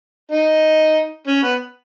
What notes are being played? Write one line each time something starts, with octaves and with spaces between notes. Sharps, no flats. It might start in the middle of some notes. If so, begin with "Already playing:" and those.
D#4
C#4
B3